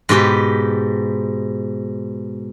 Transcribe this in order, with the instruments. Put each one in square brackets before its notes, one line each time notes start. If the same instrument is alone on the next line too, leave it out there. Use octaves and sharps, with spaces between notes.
[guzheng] G#2 B2 G4 B4